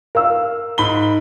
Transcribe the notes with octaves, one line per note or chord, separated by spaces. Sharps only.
A#4 F5 E6
G#2 B5 G7